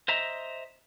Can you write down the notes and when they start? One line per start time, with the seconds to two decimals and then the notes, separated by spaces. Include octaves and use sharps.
0.08 C5 D#5 E5 A#5